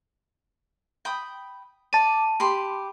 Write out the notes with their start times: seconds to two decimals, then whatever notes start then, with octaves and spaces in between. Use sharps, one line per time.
1.05 G5 B5 D#6
1.93 D5 A5 D#7
2.40 G4 B5 C6